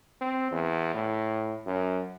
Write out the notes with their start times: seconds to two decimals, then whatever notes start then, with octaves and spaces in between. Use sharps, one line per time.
0.21 C4
0.52 E2
0.94 A2
1.66 F#2